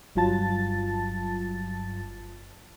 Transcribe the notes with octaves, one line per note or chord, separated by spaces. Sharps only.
G1 G2 F#3 F4 A5 A6